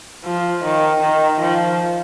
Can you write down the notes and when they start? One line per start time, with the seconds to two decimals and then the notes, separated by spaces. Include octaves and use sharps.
0.25 F3
0.64 D#3
1.01 D#3
1.40 F3